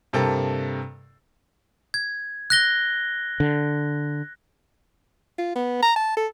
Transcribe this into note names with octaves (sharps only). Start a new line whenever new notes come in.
G2 C3 A#3 A4 G5 A#5
G#6
F#6 A#6 G7
D3
F4
B3
A#5
A5
A4